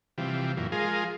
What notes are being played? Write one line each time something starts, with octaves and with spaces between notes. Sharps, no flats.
C3 E3 F3 G3
F#2 A#2 E3
F3 G#3 F4 G#4 A#4